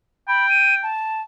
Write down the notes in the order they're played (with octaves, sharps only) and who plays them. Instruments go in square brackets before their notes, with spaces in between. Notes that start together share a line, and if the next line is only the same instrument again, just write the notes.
[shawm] G5 [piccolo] B5
[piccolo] D#7
A5